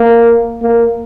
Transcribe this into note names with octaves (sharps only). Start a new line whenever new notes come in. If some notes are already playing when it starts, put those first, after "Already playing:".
Already playing: A#3
A#3